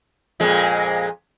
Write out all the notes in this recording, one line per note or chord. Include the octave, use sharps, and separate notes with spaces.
F2 A#2 G#3